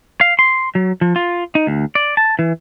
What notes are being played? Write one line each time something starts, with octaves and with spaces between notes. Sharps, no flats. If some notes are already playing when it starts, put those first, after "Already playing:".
F5
C6
F#3
F3
F4
D#4
D2
D5
A5
E3